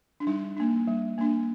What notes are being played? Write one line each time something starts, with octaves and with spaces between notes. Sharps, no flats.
D4
G3 D#4
A#3 D4
G3
A#3 D4